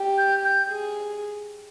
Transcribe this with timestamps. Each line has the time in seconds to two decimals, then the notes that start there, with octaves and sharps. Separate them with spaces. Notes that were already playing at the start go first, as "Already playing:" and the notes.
Already playing: G4
0.18 G6
0.44 G6
0.69 G#4